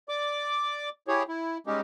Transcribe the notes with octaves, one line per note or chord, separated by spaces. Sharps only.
D5 D6
E4 G4 G#4 C#5
E4
G3 G#3 C#4 D#4 G4